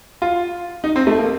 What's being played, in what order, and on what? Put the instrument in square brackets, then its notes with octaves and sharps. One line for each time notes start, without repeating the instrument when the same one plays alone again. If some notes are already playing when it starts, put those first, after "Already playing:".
[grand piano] F4
D#4
C4
A3
A#3